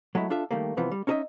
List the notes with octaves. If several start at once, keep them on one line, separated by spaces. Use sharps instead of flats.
F#3 G#3 A3 E4
D4 F4 A4 E5
D#3 G3 A3 A#3
C2 C3 E3 F3 B3
G3
C#4 D#4 A4 C#5 D#5 E5